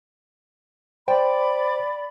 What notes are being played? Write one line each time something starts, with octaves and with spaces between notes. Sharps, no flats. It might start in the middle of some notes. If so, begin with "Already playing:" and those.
C5 D5 G5 B5